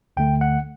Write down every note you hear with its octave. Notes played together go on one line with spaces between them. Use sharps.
D2 D3 A3 G5
F#5